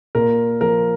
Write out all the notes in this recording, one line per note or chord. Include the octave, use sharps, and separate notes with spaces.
A#2 A#4
F3 A#4